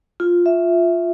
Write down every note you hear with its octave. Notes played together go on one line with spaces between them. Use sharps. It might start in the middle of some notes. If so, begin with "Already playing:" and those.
F4
E5